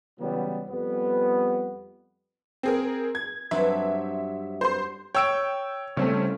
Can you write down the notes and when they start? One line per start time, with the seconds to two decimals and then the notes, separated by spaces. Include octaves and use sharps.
0.20 C#3 E3 F#3 G3 B3
0.69 F2 G3 B3
2.63 C4 G#4 A#4
3.15 G#6
3.51 G2 F#3 C4 E5
4.61 C5 C6
5.15 C#5 G5 E6 D7
5.97 C#3 G3 A3 C4 C#4